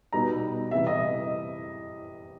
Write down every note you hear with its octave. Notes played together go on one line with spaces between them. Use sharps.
B2 G3 B3 D#4 A#5
C3 E3 G3 E5
D#5